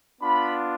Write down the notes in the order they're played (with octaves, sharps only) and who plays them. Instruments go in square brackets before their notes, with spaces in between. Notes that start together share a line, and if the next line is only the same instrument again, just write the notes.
[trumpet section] B3 D4 F4 B5